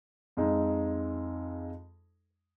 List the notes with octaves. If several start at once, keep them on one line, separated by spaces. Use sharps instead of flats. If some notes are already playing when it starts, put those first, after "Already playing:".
F2 G#3 D#4